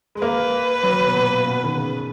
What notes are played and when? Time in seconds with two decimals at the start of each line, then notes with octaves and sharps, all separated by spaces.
0.15 G#3
0.22 A#3 B4
0.83 F#3
1.06 B2
1.14 A#2
1.45 B2
1.64 D#3
1.75 C#3